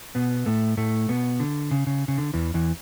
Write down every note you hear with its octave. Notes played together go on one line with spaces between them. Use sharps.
B2 B3
A2 A3
A2 A3
B2 B3
D3
C#3
C#3
C#3
D3
E2 E3
E2 E3